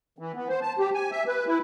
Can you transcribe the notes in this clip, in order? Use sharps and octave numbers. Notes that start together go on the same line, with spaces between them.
E3
B3
C5
A5
G4
G#5
E5
B4
E4